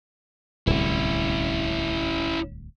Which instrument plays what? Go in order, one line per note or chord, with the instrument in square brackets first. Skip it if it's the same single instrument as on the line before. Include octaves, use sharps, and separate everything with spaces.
[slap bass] D1 C2 [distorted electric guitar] C#4 E4